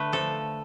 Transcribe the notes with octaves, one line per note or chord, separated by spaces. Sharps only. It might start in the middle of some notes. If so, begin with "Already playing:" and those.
Already playing: D3 A3 B4
F3 A4